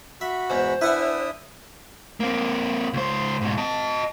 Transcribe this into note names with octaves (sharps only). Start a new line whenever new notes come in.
F#4 E5 B5
E2 G#2 C5
D4 E4 B4 E5 F#5 G#5 D#6
A#3 C4
C#2 C5
G#2 B2
D#5 A5